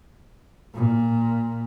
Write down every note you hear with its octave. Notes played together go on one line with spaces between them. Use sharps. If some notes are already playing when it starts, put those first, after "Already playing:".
A#2